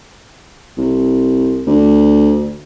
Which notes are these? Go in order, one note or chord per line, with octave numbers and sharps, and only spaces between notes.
C2
D2